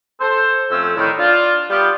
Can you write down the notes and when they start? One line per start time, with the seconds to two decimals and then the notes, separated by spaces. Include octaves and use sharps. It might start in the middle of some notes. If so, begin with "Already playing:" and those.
0.20 A4 C5
0.71 F2 A3 C4 C#4 E6
0.96 A2 D3 D#3
1.18 D4 F4
1.70 G3 B3 F4 G4